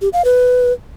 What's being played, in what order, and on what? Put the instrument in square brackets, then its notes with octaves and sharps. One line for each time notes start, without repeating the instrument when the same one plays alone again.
[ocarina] G4
F5
B4